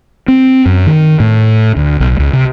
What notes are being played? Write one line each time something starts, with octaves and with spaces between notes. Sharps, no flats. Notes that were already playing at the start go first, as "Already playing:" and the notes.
C4
F#2
D#3
A2
D2
B1
C#2
C3